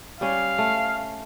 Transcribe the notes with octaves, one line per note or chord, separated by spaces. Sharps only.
G3 C#4 F5
A3